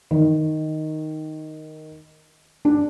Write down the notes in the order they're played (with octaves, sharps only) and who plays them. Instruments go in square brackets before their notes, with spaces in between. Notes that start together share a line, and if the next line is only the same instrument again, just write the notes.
[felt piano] D#3
D4